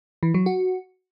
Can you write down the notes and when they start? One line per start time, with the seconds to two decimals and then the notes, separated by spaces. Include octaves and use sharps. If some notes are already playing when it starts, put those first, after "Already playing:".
0.23 E3
0.34 F#3
0.46 F#4